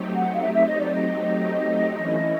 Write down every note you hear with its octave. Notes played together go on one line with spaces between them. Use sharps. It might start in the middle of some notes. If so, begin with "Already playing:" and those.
Already playing: F#3 A3 C4 D#4 G4
F#5
F5
E5
E5
D#5
D5
D#5
E3 A3 C#4 E4